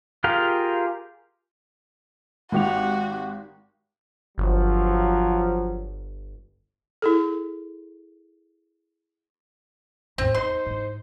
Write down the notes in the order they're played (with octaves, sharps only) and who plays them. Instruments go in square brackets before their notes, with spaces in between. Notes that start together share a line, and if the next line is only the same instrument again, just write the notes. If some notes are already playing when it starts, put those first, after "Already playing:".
[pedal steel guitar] F4 G4 G#4 A#4 F5
[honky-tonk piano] G#1 G4 F7 [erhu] F#4
[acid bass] G1 [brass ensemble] F3 F#3
[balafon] E4 G#4 A4
[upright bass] A1 E2 [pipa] C4
[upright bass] E2 [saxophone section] D#4 C5 [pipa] C6
[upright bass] G#2 E4